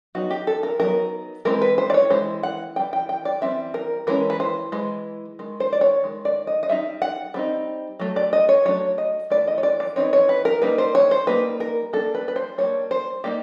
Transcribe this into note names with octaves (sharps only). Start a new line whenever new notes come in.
F#3 B3 D#4 F#4
G4
A4
A#4
F#3 B3 D#4 A#4
E3 G#3 C4 A#4
B4
C5
D5
C#5
E3 G#3 C5
F#5
E3 G3 G5
G5
G5
D5
E3 G3 C4 E5
A#4
E3 G#3 C#4 A#4
B4
C5
E3 G#3
D#3 G#3
C5
D5
C#5
D#3 G#3
D5
D#5
D#5
G3 C4 D#4 E5
F#5
G3 C4 D#4
F#3 A3
D5
D#5
C#5
F#3 A3 D4 C#5
D#5
E3 A3 D5
D#5
C#5
D5
D5
E3 A3 C4 D#4 C#5
C#5
B4
A#4
G3 A#3 D#4 B4
C5
C#5
C5
G3 A#3 D#4 B4
A#4
G3 A#3 D4 A4
B4
B4
C5
G3 A#3 D4 C#5
C5
G3 A#3 D#4 G4